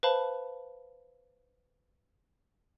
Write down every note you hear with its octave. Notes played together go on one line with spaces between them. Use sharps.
B4 C5 F5 A5 B5